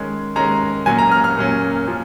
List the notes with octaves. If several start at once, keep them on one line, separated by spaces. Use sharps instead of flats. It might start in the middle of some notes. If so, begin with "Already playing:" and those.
Already playing: D#3 G#3 C#4
D#3 G#3 C#4 A#5
A#2 F#3 C#4 G#5
A#5
F6
F6
A#2 F#3 C#4
F3 A#3 C#4